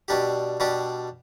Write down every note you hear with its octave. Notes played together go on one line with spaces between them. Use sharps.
B2 G3 D4 G4
B2 G3 D4 G4